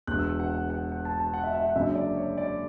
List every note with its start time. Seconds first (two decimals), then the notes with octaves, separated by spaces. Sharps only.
0.07 E1 E2 D3 F#6
0.19 E6
0.40 F#5
0.50 F#5
0.70 F#5
0.92 F#5
1.05 A5
1.20 A5
1.34 F#5
1.44 E5
1.54 E5
1.65 F#5
1.75 F#1 F#2 D3 F#3 E5
1.95 D5
2.17 C#5
2.38 D5